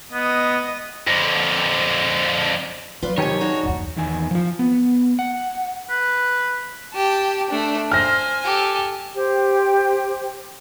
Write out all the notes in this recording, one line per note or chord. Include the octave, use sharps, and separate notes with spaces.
B3 D#5
F2 D3
F#3 F4 B4 D5
F2 C3 D#3 G4 C#5 G#5
D4 D#4 F#4 G#4
F#1 D#2
E2 D#3 G#5
F3 F4
B3
F#5
B4
G4 A5
A3 D4
C5 G#5 F6 A#6
G4 A4
G4 C5